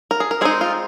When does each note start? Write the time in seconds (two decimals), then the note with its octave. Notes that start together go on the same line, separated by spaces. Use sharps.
0.11 A#4
0.20 G#4
0.31 A#4
0.41 G#3 C4 D#4 G#4
0.61 F4